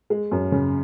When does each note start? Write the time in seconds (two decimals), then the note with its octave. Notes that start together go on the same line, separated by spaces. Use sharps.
0.10 G#3
0.32 F#2
0.52 C#3